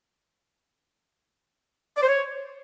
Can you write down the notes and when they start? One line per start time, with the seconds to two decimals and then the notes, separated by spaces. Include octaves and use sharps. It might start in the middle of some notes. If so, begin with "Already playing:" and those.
1.97 D5
2.02 C5
2.08 C#5